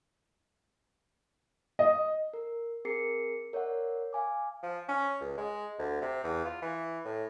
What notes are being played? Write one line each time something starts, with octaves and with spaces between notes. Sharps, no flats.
D#5
A#4
C4 G#4 A#4 C7 C#7
A#4 C#5 D5 E5 F#5
F5 G#5 D6
F3
C#4
C#2
G#3
D2
C3
E2
F4
E3
A2